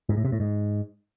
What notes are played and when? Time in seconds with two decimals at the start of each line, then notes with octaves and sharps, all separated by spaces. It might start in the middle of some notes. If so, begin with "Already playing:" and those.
0.09 G#2
0.17 A2
0.25 C3
0.32 A2
0.40 G#2